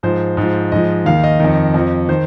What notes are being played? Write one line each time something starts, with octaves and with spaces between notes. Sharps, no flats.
G#2 F3 C5
G#2 F3
G#2 F3 D#5
D#2 D#3 F5
D#5
F2 D#3
F2 F3
D#3 C5